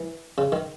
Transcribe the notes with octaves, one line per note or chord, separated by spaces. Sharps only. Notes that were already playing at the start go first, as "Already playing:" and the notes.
Already playing: E3
C#3
D#3